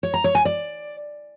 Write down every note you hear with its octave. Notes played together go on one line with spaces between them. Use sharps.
C#5
A#5
C#5
G#5
D5